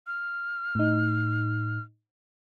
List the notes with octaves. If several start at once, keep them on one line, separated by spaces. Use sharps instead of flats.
F6
A2 D#4